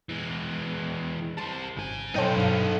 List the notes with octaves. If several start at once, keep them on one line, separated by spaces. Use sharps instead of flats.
E3 G#3
G3 C5 A5
G#1 C#3 G#5
B1 F#2 D#4 A4 C5 C#5 G5
G2 F5